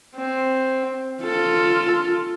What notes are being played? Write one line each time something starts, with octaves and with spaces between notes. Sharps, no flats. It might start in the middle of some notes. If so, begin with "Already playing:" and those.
C4
F4 A4